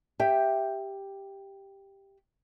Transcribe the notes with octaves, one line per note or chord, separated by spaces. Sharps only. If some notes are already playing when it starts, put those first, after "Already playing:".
G4 E5 G5